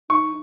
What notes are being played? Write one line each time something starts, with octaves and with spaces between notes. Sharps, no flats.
D#4 C#6